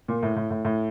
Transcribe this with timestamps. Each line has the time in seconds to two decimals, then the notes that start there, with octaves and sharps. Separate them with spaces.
0.08 A#2
0.23 A2
0.36 A2
0.51 A2
0.65 A2